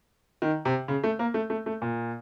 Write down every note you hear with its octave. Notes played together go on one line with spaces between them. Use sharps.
D#3
C3
C#3
A3
A#3
A3
A3
A3
A#2